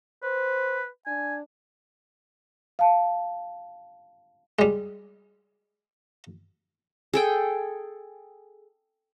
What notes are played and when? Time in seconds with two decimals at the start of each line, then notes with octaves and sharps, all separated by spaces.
0.23 B4 C5
1.07 D4 G#5
2.79 F5 A5
4.59 G3 G#3
7.14 G#4 A4 G5